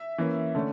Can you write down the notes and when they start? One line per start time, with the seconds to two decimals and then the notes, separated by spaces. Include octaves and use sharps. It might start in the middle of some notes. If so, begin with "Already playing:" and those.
Already playing: E5
0.18 E3 A#3 C#4
0.55 D3 A3 C#4